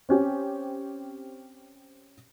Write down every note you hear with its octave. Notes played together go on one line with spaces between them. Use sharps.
C4 C#4 G4